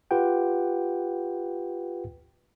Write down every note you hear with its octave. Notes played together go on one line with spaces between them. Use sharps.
F4 G4 B4 F#5 G5